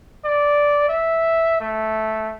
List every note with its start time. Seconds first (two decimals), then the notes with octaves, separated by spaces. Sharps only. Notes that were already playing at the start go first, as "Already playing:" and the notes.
0.25 D5
0.89 E5
1.61 A3